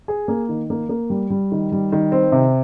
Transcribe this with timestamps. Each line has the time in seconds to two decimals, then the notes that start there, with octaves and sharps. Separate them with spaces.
0.08 G#4
0.28 A#3
0.49 D#3
0.70 A#3
0.89 A#3
1.10 G3
1.30 G3
1.52 D#3
1.72 G3
1.92 D#3
2.12 C4
2.32 C3